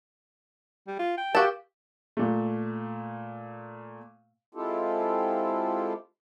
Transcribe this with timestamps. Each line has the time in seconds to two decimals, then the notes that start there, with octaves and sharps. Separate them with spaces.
0.88 G3
0.99 F4
1.18 G5
1.35 F#4 G4 A#4 F5 A5
2.17 A#2 A3
4.55 G#3 C4 E4 F4 G4 A4